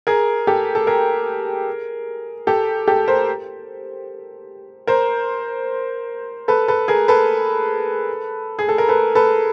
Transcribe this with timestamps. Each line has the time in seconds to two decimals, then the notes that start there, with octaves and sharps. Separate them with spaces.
0.07 G#4 A#4
0.47 G4 A4
0.75 A4
0.87 G#4 A#4
2.47 G4 A4
2.88 G4 A4
3.08 A#4 C5
4.87 A#4 C5
6.48 A4 B4
6.68 A4 B4
6.88 G#4 A#4
7.08 A4 B4
8.59 G#4
8.69 A4
8.78 A#4
8.89 A4 B4
9.15 A4 B4